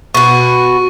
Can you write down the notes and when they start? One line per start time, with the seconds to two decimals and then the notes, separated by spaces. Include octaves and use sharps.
0.14 B2 F#4 C#6